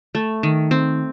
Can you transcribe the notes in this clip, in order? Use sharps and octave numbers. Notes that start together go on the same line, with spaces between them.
A3
D#3
C4